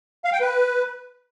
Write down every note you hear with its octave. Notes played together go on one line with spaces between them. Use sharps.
F5
G5
B4